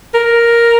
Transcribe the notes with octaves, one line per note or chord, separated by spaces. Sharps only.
A#4